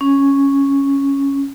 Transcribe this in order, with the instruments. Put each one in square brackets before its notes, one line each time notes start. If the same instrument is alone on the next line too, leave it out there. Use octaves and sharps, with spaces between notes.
[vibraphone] C#4